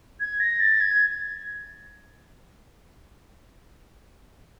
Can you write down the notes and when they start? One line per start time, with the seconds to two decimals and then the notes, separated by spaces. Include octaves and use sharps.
0.20 G#6
0.40 A#6
0.60 A6
0.81 G#6